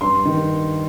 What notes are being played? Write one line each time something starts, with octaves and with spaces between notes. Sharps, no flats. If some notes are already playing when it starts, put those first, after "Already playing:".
G2 C6
D#3